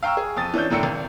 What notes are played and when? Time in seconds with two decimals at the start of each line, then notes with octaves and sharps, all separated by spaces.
0.03 F5 G5 A#5 C#6 E6
0.17 G#4
0.37 F2 D#6 A6
0.54 E3 C#4 D4 G6
0.70 F#2 A2 D3 G5 C#7
0.83 G#1